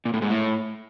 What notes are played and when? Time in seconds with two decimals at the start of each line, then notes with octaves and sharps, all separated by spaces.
0.05 A#2
0.14 A2
0.22 G#2
0.30 A2